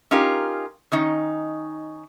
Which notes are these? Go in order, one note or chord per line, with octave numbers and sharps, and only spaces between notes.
C#4 D#4 F4 G4 A#4
D#3 C#4 D#4